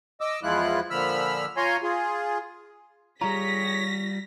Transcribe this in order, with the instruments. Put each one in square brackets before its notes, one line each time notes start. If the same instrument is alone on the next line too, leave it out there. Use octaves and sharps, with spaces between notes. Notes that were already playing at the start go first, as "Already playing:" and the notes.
[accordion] D#5 D6 E6
E2 F3 G#3 E4 F4 F#6
A#2 D3 F3 B5 E6 F6
F4 C#5 G#5 A#5 C6
F4 G#4
[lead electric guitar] G3 F4 [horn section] G4 G#4 C#5 [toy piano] A#5 [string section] A#6 B6